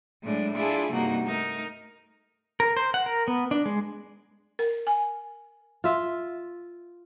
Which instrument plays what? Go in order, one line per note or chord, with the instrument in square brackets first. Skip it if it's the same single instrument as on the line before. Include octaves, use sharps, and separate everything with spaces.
[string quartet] A2 F#3 G#3 D4
D4 E4 F4 G#4 A4
G2 C3 A#3 D#4 F#4
A3 D#4 A#4
[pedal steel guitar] A#4
C5
F#5
A#4
B3
D4
G#3
[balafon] A#4
G#5
[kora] F4 E5